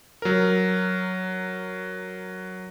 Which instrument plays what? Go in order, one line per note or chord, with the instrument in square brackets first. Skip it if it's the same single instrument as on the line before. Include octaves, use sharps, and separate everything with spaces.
[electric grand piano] F#3 A#4